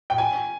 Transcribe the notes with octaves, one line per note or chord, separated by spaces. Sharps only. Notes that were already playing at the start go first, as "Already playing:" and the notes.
G5
G#5